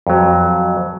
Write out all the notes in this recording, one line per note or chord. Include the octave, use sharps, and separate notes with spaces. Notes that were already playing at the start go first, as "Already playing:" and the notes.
F2 F#3